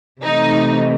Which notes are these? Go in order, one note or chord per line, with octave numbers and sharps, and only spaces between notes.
C3 E3 A3 D#4